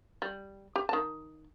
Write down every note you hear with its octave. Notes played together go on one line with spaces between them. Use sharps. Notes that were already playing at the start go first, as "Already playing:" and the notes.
G3
G4
D#3 A5